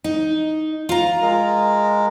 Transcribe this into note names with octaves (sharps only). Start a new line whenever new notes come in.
D#4
F4 A#5
G#3 A#4